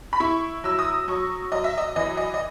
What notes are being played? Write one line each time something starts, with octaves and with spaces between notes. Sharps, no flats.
B5
E4 C#6
F#3 E6
D#6
F#3 C#6
F#3 D#5
E5
D#5
E3 D#5
D#5
D#5